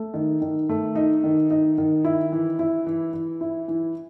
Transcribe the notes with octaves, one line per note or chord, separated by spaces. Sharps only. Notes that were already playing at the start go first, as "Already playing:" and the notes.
Already playing: A3
D#3
D#3
A3
D#4
D#3
D#4
D#3
E4
E3
E4
E3
E3
E4
E3